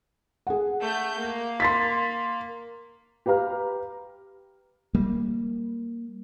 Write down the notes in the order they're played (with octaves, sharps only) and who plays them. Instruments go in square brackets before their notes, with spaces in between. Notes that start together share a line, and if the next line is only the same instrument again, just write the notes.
[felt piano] G#4 F#5
[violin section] A3 G6
A#3
[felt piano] C6 A6 B6
[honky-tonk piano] G4 B4 F5 A#5 F6
[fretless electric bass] G3 A#3